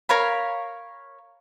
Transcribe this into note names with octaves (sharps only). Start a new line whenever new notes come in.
A#4 C#5 F5 B5